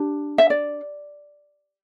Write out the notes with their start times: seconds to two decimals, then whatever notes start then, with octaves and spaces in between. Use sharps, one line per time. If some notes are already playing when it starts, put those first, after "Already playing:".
Already playing: D4 G4
0.38 E5
0.50 D5